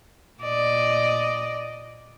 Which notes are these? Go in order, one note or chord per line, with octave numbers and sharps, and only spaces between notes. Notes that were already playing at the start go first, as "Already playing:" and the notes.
A#2 D5 D#5